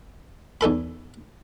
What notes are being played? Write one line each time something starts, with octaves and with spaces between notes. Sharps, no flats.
E2 D#4 A4 B5